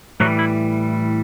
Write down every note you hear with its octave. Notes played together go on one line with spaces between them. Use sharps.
A2 E3 F#3 G3 F#4
E4